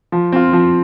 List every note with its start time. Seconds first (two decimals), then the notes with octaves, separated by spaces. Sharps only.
0.12 F3
0.32 C4 F4
0.53 F3